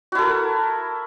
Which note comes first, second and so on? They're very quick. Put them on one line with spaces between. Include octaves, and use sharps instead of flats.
F#4 E4 A4 A#4